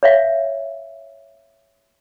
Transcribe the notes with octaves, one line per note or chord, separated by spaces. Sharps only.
C#5 E5 F5